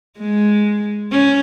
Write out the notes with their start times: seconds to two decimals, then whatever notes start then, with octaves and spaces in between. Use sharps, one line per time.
0.18 G#3
1.12 C#4